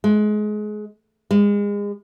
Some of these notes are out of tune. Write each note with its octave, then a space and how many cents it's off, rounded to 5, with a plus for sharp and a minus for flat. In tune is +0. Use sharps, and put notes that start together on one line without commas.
G#3 +25
G#3 -30